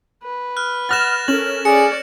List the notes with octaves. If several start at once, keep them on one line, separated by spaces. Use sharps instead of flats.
B4
F6 F#6
F#5 F6 F#6 A6 A#6 E7
C#4 A4 A#4 E7 F#7
G#4 D5 C#7